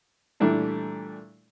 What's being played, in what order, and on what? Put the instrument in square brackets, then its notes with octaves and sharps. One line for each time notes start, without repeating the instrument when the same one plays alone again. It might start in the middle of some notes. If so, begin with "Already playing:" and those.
[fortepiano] A#2 E3 G3 A3 D4 E4